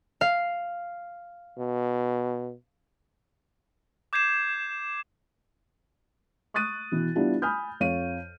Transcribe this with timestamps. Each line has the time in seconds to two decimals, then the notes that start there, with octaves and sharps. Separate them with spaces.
0.21 F5
1.58 B2
4.13 D6 G6 G#6 C7 E7
6.54 C#6 D#6 F#6 A6 D#7
6.91 B2 E3
7.15 G3 B3 D4 E4 F4 G4
7.42 G#5 B5 D#6 F6 G6
7.80 F2 C#5 F5 D#7